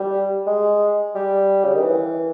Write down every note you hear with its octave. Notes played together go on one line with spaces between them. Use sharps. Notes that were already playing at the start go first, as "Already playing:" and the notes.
Already playing: G3
G#3
G3
C#3
D#3
E3